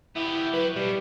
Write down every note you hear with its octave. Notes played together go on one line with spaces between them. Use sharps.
B3 E4 G4
F#3 B4
B2 G3